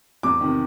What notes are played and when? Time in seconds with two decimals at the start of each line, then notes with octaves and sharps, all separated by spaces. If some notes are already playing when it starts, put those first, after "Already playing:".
0.23 E2 D6
0.41 C3 D#3